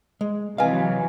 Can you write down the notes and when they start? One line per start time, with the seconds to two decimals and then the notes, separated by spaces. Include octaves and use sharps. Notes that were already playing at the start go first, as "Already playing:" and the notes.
0.21 G#3
0.58 C3 E3 F#3 B4 D#5 F5 G#5